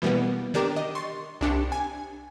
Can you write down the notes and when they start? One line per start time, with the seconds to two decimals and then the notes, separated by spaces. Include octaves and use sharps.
0.02 B2 E3 G3 A#3 B3
0.54 D#3 D4 G4 A#4 D6 E7
0.76 D#5
0.95 C6 C#6 A6
1.41 C2 D4 G4 C#7
1.72 G#5